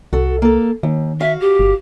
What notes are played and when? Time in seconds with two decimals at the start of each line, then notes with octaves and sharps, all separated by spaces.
0.13 C2 F#4 A4
0.42 A#3 A4
0.83 D#2 D#3
1.20 F#4 E5 F5
1.40 G4
1.59 G1